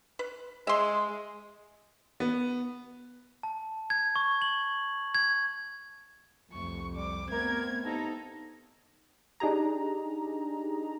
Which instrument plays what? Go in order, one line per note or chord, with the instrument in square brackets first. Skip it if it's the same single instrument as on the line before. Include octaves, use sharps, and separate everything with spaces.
[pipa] B4
[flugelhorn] G#3 [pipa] E5 C6
[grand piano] B3
[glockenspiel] A5
G#6
C#6
F#7
G#6
[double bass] C2 F2 [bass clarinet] A3 [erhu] C#6
[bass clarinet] G3 [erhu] D6
[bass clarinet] A3 [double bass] B3 C4 [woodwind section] A#4 [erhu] G#6
[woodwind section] G2 A#5 [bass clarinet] D#4 [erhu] A4
[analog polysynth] D4 D#4 G4 G#4 A#5